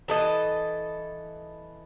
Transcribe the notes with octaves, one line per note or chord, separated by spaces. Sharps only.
E3 A4 D#5